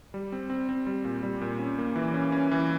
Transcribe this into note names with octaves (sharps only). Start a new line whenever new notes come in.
G3
C4
C4
C4
G3
A#2
G3
A#2
C#4
A#3
E3
C#4
C#4
E3